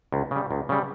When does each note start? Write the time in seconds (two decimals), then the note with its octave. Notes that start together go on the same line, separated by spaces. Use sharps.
0.12 C#2
0.31 C#3 G3
0.51 C#2
0.69 C#3 G3